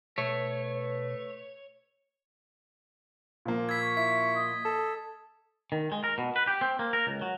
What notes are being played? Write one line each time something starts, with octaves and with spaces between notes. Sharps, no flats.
B2 A3 B4 C#5
A#2 F3 A#3
E4 G#6 B6
C#6
E4 B6
D#5
A4
D#3
G#3
A#4
B2
B4
G4
C4
A#3
A#4
C#2
F#3